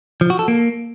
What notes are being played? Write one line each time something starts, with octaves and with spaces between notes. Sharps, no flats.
F3
F#4
A4
A#3